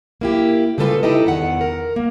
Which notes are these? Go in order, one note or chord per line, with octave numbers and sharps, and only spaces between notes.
A#3 E4 G4
C#3 G3 F4 A4 B4
C#3 D#4 E4 G4 A4 D#5
E2 D#3 F#5
A#4
A#3